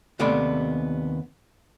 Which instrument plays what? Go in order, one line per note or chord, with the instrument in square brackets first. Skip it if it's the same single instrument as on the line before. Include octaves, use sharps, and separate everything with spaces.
[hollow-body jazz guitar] D#2 C3 A3 B3 D5 B5